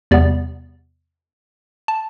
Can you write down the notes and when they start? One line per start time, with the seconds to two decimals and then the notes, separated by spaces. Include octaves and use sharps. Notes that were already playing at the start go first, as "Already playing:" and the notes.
0.11 E2 C3 G3 B3 D5
1.88 A5